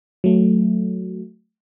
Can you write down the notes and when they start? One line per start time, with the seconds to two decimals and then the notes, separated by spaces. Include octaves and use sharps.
0.24 F#3 A3